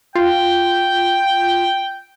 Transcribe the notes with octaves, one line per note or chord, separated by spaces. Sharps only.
F4 G5